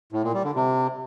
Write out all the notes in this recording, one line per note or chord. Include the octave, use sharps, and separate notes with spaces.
A2
A#2
G3
D3
C3